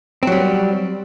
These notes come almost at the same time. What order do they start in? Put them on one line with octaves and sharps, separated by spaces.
C4 F#3 G3